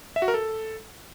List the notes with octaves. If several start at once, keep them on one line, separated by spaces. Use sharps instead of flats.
E5
F#4
A#4
A4